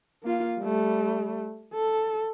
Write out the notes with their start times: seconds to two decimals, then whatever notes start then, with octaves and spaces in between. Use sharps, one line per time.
0.23 A#3 F4
0.59 G3 A3
1.74 A4